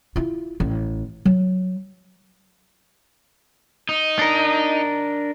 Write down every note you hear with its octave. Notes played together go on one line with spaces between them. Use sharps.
E4 F4
A1
F#3
D#4
D4 A#4